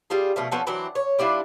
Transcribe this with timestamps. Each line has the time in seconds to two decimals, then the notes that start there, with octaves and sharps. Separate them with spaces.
0.10 G3 F4 G#4
0.36 B2 F3 A3
0.52 F3 B3 C#4 A4
0.67 E3 F#3 C4 D4
0.95 C#5
1.19 G3 D4 E4 F4